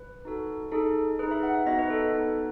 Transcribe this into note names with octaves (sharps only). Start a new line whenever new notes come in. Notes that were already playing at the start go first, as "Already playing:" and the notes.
Already playing: B4
D#4 F#4 A4
D#4 G#4 A4
D#4 G#4 B4
E5
F#5
E5
B3 D#4 F#4 D#5
B4
A4
A4
B3 D#4 F#4 B4
B4